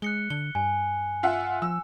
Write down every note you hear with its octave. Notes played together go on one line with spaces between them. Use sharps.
G#3 F#6 C#7 G7
D3 G7
G2 G#5
F4 E5 F#5
F3 E6